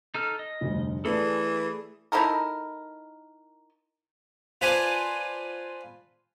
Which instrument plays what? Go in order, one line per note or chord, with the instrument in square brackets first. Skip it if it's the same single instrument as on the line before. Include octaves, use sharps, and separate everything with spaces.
[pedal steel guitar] D#4 A4 F6
D#5
[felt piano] F1 D2 G2
[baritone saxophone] E3 [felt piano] A3 B4 D5 [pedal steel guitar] G#4 A4
[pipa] D#4 E4 A4 A#4
[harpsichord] F4 B4 C5 D5 G#5 A5